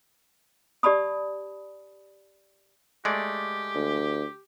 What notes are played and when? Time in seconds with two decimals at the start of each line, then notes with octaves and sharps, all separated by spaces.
0.83 G4 D5 A5 B5 D#6
3.05 G#3 A3 G4 D5
3.75 D2